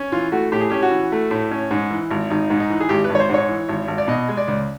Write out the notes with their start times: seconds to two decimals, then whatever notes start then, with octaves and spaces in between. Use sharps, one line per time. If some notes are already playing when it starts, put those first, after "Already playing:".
Already playing: C#4
0.12 E3 F4
0.32 A3 F#4
0.52 A2 G4
0.61 G#4
0.70 C#4 G4
0.83 F#4
0.91 E3
1.12 A3
1.31 A2
1.51 C#4
1.71 G#2
1.91 E3
2.10 G#1
2.30 G#1 D#4
2.50 G#2
2.60 D#4
2.70 E3
2.81 G#4
2.89 G#1 G4
3.04 B4
3.10 G#1
3.15 C#5
3.20 C5
3.30 G#2 C#5
3.49 E3
3.69 G#1
3.88 G#1
3.98 D5
4.08 B2 D#5
4.28 G#3
4.37 D5
4.48 C#2